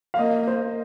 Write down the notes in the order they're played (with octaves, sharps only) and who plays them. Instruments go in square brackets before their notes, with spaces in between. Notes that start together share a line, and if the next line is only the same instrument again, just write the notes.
[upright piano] F5
[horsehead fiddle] A#3 [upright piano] D#5
[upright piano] C5